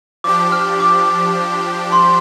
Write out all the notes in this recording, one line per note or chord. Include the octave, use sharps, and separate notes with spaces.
F3 D4 G4 D6
F6
D6
C6